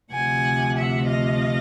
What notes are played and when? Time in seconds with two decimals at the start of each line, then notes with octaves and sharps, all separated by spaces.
0.11 D2 C3 F3 F#5 G#5
0.76 E5 F#5
1.08 D#5 F5